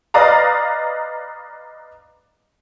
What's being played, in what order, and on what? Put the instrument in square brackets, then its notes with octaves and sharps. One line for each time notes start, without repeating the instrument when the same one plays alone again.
[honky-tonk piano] B4 D5 D#5 F5 A#5